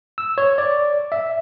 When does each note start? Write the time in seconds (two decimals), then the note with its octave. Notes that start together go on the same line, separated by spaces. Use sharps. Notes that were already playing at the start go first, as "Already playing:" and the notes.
0.18 E6
0.38 C#5
0.58 D5
1.12 E5